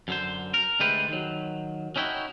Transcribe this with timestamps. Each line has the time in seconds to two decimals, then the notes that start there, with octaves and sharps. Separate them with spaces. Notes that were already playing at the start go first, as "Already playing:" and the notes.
0.08 F#2 D3 C5
0.54 A#4
0.80 D3 G#3 A3 G4 B4 C5
1.08 D#3 F#3
1.96 C#4 D#4 E4 F#4 G5